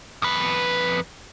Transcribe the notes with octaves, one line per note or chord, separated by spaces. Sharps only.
F2 B4